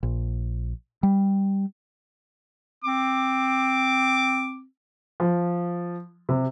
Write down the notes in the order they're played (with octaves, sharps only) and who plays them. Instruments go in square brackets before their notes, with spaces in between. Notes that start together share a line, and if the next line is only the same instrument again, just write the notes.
[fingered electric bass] A#1
G3
[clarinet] C4 [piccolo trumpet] D6
[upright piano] F3
C3